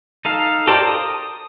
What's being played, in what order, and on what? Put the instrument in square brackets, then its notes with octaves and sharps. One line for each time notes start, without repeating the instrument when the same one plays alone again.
[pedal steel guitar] D#4 A4 F5
G4 A4 A#4 C5 D5
D#6